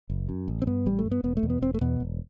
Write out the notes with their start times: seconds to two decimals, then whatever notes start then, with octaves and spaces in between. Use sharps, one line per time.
0.10 F#1
0.29 F#2
0.48 A1
0.62 C4
0.67 G2 B3
0.86 A1 G3
0.99 A3
1.05 G2
1.11 B3
1.24 E1 B3
1.37 A3
1.43 E2 B2
1.50 B3
1.62 E1 C4
1.74 A3
1.81 E2 B2 B3
2.00 E1